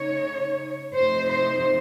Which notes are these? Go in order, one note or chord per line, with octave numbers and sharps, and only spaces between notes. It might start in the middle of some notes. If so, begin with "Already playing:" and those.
Already playing: C#3 A3 D#4 C#5
C3 F3 A3 D#4 C5
C5